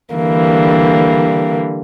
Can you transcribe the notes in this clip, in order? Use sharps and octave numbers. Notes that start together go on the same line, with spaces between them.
D3 E3 G3 A#3